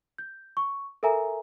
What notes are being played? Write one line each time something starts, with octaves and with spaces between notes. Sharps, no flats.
G6
C#6
A4 A#4 E5 G#5 A#5